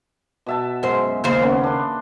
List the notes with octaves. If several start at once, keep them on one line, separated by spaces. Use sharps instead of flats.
B2 E5 A5
F#2 G#3 C5
D#2 C#3 C5
A#3 B3 C#4
D4 C6